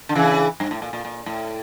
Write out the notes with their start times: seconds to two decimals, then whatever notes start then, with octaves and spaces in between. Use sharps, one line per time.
0.09 D3
0.15 C#3 E3
0.60 G2
0.71 A2
0.82 A#2
0.93 A#2
1.05 A#2
1.26 A2